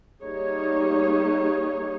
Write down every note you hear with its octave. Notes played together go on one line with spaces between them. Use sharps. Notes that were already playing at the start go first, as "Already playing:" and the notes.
G3 A#3 D#4 G#4 C#5